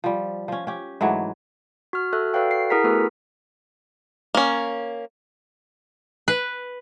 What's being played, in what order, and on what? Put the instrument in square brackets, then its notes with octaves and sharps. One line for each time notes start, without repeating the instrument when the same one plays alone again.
[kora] F3 G3
F3 C#4
C#4 G4
G#2 E3 F#3 A3
[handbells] F#4 F6
F#4 A4 E5 F#6
F#4 A4 B4 D5 F5 G5
C7
E4 G#4 A#4 F#5 A#5 B6
A3 B3 E4 F#4 A4 B4
[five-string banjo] A#3 C#4
[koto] B4